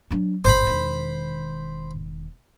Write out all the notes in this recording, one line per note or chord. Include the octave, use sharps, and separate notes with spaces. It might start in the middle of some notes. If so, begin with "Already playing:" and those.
F#3 D4
G#1 E2 C5 B5
E1 D#3